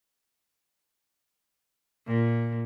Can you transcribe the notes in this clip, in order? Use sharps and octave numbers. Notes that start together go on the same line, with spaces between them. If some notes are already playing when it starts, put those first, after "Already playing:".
A#2